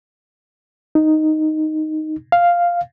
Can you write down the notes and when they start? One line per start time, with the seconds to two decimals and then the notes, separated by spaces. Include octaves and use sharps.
0.95 D#4
2.32 F5